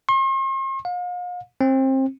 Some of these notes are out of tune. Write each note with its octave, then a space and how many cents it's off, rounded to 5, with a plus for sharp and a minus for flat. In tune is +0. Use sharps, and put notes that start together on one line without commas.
C6 +45
F5 +40
C4 +25